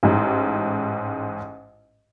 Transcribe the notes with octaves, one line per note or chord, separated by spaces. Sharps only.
A1 G#2